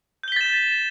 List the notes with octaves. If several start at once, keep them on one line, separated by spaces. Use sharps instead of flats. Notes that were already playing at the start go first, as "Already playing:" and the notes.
G6 A6 B6 E7 G7